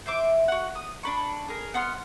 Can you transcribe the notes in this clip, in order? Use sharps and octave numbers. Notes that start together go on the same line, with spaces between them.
C5 E5 D6
F#4 F#5
D#6
D4 B5 C#6
G#4 A#4
B3 F#5 C6 F6